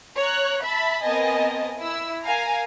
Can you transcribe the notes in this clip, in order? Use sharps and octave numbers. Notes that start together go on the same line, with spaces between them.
C#5 A#5 F#6
E5 A5 B5
B3 C4 A#4 D#5 G#5 A5
E4 E6
A#4 F5 G#5 A#5